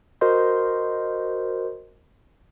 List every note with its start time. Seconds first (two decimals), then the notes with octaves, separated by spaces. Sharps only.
0.21 F#4 A#4 C5 D#5 C6 G6